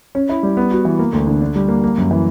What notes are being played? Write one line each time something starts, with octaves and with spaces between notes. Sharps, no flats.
C#4
E4
G3
B3
F#4
E3
A#3
D2
D3
D4
G3
A#3
A#3
F#2
E3